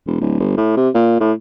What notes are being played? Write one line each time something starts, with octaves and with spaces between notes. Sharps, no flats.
E1
D1
G1
A2
C3
A#2
A2